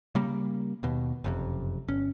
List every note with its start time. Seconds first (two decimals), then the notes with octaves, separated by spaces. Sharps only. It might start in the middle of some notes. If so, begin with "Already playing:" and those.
0.15 C#3 G3 A#3
0.83 D#2 B2
1.24 F#1 F2 C3
1.88 G1 C#4